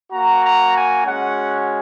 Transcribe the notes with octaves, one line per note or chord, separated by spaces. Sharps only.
A#3 F#4 A#5
A#5
G#5
G#3 C#4 F#4 F#5